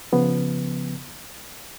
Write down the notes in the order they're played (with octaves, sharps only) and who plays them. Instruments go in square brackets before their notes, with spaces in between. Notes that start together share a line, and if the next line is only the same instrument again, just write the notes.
[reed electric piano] C#3 F3 B3